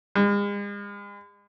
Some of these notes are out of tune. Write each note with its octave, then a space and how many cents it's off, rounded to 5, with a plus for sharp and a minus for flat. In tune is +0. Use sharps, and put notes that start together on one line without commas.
G#3 -40